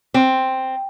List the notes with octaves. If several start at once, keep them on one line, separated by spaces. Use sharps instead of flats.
C4